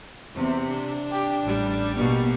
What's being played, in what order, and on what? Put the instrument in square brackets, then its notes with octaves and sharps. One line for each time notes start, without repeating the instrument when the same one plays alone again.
[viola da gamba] E2 [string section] C3
[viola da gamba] D4
[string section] G4
A1 G3
[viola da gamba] B2 A#3 B3